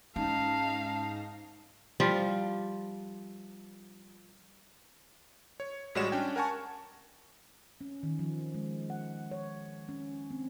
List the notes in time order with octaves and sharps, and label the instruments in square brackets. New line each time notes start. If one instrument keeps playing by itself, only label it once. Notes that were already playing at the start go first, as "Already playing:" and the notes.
[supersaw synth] G#2 D#4 A#6 [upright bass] C#4 [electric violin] F5 [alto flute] A5
[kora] F3 G3 F4
[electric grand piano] C#5
A1 G3 G#3 F#4 C#5 E7
C#4 D4 G5
A#4 F#5 G#5 A5 C#6
[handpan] C#4
D#3
F3
G#3
F#5
C#5
C#4
C4